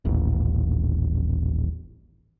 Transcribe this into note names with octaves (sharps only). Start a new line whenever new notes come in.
D#1 A1